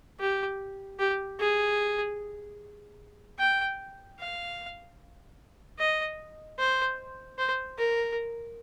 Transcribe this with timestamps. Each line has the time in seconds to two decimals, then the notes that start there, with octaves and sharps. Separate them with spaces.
0.20 G4
0.99 G4
1.39 G#4
3.39 G5
4.19 F5
5.79 D#5
6.59 C5
7.38 C5
7.78 A#4